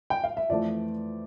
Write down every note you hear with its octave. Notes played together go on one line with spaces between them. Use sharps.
G5
F5
E5
F2 E3 A3 D5